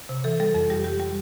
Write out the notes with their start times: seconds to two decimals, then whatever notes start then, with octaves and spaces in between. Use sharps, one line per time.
0.09 C3
0.24 E3 A4
0.40 G3 A4
0.54 F2 A4
0.70 G3 G4
0.84 G3 G4
1.00 G3